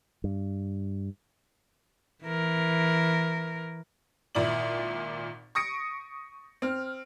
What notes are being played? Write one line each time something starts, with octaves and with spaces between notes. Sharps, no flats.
G2
E3 A#4
G#1 A#2 E4 D5 F#7
C#6 D#6 A#6 C#7 D7
C4 F6